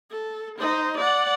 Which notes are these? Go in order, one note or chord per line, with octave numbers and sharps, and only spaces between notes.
A4
D#4 C5
D5 F#5